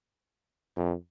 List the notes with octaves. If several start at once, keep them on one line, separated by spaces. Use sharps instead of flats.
F2